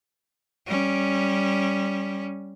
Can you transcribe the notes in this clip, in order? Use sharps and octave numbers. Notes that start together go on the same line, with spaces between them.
G3 C#4